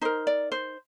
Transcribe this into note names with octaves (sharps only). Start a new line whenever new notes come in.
D#4 A#4 C5
D5
C5